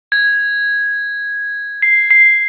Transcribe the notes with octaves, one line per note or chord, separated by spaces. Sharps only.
G#6
C7
C7